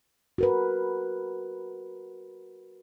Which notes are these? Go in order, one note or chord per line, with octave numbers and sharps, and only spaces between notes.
F#4 A#4 B4